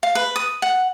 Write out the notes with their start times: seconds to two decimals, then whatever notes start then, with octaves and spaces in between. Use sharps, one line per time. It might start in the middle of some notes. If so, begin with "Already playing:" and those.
0.03 F5
0.15 B4
0.36 D#6
0.62 F#5